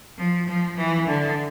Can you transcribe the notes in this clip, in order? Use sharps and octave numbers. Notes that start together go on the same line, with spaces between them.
F3
F3
E3
D3